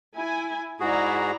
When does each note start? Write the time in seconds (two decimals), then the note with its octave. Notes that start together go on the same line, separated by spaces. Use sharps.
0.16 E4 G#5
0.80 G#2 E4 F#4 G#4 D5 A#5